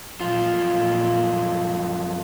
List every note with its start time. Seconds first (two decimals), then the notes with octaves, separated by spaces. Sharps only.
0.21 F#2 A#2 F3 F4